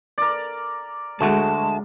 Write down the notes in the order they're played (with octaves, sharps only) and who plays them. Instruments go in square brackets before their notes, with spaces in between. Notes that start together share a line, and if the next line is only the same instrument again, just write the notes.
[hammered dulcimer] A#4 D5
[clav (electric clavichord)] D2 A3 F#4 [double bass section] G#3 [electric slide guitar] A5